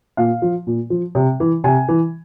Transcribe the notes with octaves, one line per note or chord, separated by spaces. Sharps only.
A#2 F5
F3
A#2
F3
C3
E3
C3 G#5
E3